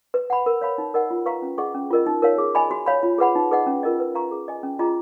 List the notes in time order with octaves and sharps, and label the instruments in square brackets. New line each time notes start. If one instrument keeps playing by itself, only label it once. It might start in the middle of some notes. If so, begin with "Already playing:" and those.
[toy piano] B4
F#5 B5
A#4
C#5 F5 B5
D#4
A#4 D#5 F#5
F4
B4 F5 A#5 C#6
C#4
G#4 D#5 F#5 C#6
C#4
F4 A#4 D#5
D#4
A#4 C#5 F5
G#4
D#5 G#5 B5
F#4
C#5 F5 B5
F4
G#4 B4 F#5 B5
D#4
G#4 B4 D#5 F#5
C#4
F4 A#4 D#5
B4
F5 A#5 C#6
G#4
D#5 G#5
C#4
F4 G#4 D#5 A#5